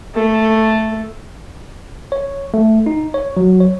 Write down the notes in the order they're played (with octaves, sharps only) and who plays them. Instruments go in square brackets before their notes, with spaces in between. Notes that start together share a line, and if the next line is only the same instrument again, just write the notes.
[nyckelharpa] A3
[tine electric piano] C#5
A3
D#4
C#5
F#3
C#5